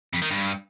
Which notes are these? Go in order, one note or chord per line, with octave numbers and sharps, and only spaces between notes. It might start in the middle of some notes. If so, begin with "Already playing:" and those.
F2
D#3
G2